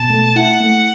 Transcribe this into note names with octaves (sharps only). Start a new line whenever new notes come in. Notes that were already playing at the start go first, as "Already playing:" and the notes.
Already playing: B2 A5
A3
E4 F#5
A3